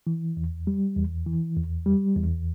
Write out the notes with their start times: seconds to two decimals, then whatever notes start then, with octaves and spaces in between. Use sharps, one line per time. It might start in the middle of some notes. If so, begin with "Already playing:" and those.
0.07 E3
0.37 E2
0.67 G3
0.96 E2
1.26 E3
1.56 E2
1.86 G3
2.16 E2